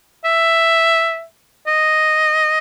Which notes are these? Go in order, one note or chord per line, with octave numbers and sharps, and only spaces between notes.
E5
D#5